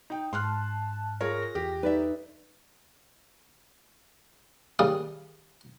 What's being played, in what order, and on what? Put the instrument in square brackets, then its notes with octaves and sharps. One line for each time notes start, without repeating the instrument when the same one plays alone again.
[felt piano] D#4 G5
[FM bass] G#2 [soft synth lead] A5 [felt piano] C6 F6 F#6
[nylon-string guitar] F4 G#4 [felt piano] A#4 C#5 [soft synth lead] A#6
[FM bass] E2 [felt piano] G4
[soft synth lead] D#4 [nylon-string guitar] B4 D5 E5
[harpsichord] D#2 C#3 G3 F5 D#6